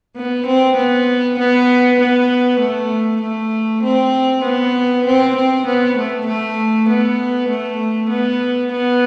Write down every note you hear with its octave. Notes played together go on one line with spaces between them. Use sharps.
B3
C4
B3
B3
B3
A3
A3
C4
B3
C4
C4
B3
A3
A3
B3
A3
B3
B3